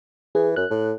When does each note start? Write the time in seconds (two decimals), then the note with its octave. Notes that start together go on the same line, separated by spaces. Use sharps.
0.35 E3 G#4
0.56 F#2 F#6
0.71 A2